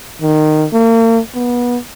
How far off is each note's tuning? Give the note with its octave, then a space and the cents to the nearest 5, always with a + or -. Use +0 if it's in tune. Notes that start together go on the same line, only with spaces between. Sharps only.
D#3 -15
A#3 -40
B3 -25